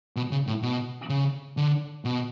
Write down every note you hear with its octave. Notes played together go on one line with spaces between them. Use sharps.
B2
C#3
A2
B2
C#3
D3
B2